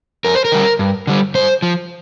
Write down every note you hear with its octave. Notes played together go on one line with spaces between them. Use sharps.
F2 A#4
C5
A#4
D3 G3
G2
D3 G3
G2 C5
F3